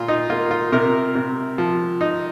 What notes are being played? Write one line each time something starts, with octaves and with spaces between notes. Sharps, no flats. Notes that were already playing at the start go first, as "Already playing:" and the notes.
Already playing: A#2 F4
D#4
A#3 F4
F4
C3 A#4
C3
F3
D#4